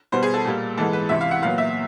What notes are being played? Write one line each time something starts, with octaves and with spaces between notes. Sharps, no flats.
B2 G3 B3 C5
G#4
A4
A#2 G3 A#3
G#2 E3 G#3 B3 A4
B4
C#2 C3 E3 E5
F5
F#5
A#2 F#3 B3 F5
E5